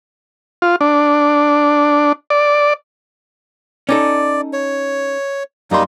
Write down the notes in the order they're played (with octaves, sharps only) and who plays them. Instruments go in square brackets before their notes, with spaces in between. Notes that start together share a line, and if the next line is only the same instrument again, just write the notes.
[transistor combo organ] F4
D4
D5
[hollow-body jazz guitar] C#4 D#4 A4 [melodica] D5
[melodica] C#5
[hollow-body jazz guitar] F#2 C6 [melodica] G3 A#3 D#4